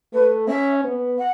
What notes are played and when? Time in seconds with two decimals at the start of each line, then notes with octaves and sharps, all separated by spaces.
0.13 A3 B4
0.48 C#4 E5
0.84 B3
1.18 F#5